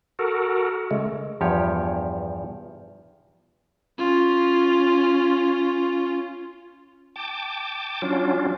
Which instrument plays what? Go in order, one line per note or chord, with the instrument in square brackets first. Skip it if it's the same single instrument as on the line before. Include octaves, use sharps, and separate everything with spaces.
[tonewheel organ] F#4 A4 A#4
C#3 G#3 A3
[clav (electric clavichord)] E2 G2 F3 G4 C#5
[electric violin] C#4 F4
[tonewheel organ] G5 A5 D6
F#3 C#4 D4 F4